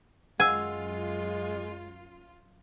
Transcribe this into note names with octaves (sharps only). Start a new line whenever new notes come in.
F#2 G#3 F4 F#5 G#5 E6